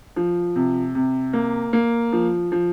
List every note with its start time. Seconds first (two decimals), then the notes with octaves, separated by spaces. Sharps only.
0.16 F3
0.56 C3
0.95 C3
1.33 A#3
1.73 A#3
2.13 F3
2.52 F3